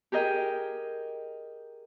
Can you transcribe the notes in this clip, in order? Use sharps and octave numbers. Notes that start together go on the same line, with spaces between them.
G4 G#4 A#4 D#5 G5